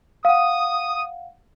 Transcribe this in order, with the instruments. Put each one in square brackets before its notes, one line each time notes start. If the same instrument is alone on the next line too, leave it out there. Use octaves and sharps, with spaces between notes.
[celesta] F5 F#5 [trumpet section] D#6